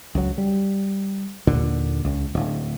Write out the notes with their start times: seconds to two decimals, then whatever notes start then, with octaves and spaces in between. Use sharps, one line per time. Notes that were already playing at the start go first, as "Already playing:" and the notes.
0.15 C#2 F#3
0.38 G3
1.47 D#2 A#2 D3
2.05 C#2
2.35 D1